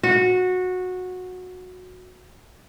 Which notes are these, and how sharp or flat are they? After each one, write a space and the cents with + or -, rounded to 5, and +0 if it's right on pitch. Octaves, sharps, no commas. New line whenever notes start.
F#4 -15